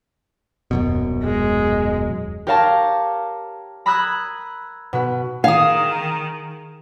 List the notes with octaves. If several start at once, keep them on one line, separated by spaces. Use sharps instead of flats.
D#1 F#2 B2
G#3
G4 A#4 C#5 F5 A5 A#5
A#5 B5 D#6 E6 F#6 G#6
B2 B4
D#3 G#4 F5 D#6